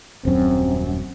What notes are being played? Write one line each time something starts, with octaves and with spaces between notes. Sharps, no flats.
D#1 F#2 C4